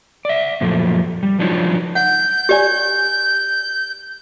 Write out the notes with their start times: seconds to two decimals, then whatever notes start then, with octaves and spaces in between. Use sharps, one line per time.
0.25 D5 E5
0.61 F#2 A#2 F3 A3
1.23 G3
1.39 F3 F#3 D4 D#4 F4
1.95 F#5 G6
2.49 G4 D5 G#5